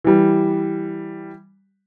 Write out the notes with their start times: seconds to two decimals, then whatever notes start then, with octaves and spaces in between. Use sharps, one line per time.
0.04 E3 G3